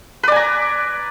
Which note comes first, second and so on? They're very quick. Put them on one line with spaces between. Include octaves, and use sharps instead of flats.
B4 D5 G#5 A#5